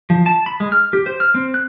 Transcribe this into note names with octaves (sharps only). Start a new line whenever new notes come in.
F3
A5
B5
G#3
F6
G4
C5
F6
C4
F#6